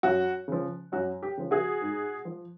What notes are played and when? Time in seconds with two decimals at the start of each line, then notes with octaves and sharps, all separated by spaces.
0.03 F#2 F#4
0.48 C#3 F3
0.92 F#2 F#4
1.23 G4
1.37 C#3 F3
1.51 F#4 G#4
1.82 G#2
2.25 F3